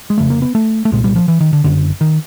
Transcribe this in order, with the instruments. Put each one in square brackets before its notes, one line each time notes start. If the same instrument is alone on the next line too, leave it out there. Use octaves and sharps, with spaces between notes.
[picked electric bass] G#3
F1 F2 C#3 A3
A#3
B3
A3
A3
C2 A#2 G#3
G3
F3
E3
D#3
D3
F#1 F#2 D3
D#3